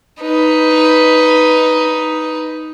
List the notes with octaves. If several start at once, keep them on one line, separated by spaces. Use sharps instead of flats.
D#4 B4